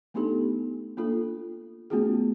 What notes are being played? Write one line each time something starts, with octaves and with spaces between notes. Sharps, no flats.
A3 B3 D4 D#4 G4 A4
A#3 D4 F4 A4
A3 B3 C#4 F4 F#4 G#4